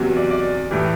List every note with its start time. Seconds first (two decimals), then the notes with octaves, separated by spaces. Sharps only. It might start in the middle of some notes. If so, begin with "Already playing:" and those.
Already playing: E2 C3 F#3
0.16 D5
0.31 D5
0.70 A2 E3 G3